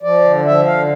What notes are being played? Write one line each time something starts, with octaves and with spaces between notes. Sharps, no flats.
F3 D5
D3
F3 E5
D3 F5